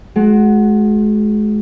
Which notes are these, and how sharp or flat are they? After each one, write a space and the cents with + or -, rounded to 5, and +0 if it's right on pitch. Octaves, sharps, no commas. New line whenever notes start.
G#3 +35 F#4 +0